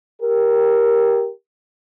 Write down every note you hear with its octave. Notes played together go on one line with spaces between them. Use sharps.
G4 A#4